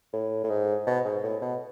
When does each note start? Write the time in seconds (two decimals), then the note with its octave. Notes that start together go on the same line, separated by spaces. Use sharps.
0.13 A2
0.44 A2
0.50 G#2
0.87 B2
1.05 G#2
1.23 A2
1.41 B2